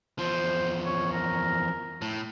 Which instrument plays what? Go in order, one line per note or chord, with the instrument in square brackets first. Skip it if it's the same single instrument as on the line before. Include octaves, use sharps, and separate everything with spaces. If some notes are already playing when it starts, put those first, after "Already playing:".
[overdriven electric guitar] E2 F3 [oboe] C5
[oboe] C#5
A#4
[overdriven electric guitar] A2